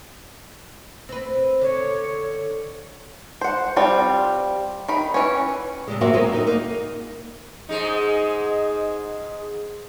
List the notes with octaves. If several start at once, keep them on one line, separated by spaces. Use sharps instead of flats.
C4 B4
D3 C#5
C5 F#5
G3 C4 F4
D#3 B5
E3 C#4
C3 G3 G#3
F#3 A#3 C4 F#4 E5 F#5
G#3 B3 E4 A#4
D#4 F#4 A#4
A#3 D#4
G#2 G#3 D#4